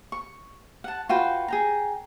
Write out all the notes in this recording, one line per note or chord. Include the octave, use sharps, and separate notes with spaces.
C#6
F#5 A5
F4 F#4 B4 G5
G#4 G5 A#5